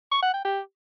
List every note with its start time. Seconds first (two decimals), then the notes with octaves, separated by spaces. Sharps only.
0.11 C#6
0.22 F#5
0.34 G5
0.45 G4